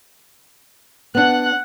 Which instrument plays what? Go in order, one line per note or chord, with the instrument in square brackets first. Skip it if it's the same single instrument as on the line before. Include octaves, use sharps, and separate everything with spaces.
[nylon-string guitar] B3 D4 [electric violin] F#5 F#6